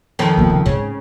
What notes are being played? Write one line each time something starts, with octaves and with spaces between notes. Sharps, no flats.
F2 D#3 F3
E2 A#2
C#3
G#2 C#3